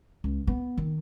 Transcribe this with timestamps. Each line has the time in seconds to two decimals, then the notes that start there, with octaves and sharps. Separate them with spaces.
0.24 C#2
0.47 B3
0.78 D#3